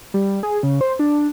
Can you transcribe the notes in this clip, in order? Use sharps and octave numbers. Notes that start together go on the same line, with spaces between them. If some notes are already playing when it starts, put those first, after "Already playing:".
G3
G#4
C#3
C5
D4